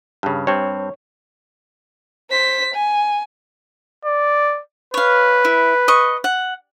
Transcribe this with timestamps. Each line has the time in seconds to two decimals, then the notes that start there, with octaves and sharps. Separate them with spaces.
0.23 G2 C#3
0.47 G2 C4 C#5
2.30 C5 B6
2.74 G#5
4.05 D5
4.94 B4 C#5 F5
5.45 E4
5.88 D#5 C#6
6.24 F#5